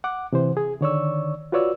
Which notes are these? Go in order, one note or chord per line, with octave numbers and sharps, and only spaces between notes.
F#5 D6
C3 E3 C5
G#4
D3 D#3 C#5 D5 C#6 E6
F4 F#4 B4 C#5 D5 E6